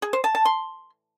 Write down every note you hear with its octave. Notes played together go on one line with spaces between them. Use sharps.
G#4
C5
A5
A5
C6